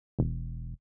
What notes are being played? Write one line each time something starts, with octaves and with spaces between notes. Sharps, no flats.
E1